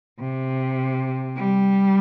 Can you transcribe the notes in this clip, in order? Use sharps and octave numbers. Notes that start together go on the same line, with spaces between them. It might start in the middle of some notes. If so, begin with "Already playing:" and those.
C3
G3